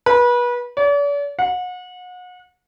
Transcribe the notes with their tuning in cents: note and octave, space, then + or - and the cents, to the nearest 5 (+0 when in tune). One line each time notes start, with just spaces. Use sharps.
B4 -30
D5 -45
F#5 -35